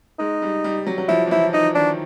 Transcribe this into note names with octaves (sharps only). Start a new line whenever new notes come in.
G#3 D#4
G3
G3
F#3
F#3
F3 E4
E3
F3 E4
E3 D#4
D#3 D4